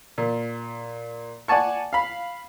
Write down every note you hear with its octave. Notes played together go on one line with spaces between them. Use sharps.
A#2
D5 F#5 G#5 A5 C#6
F5 B5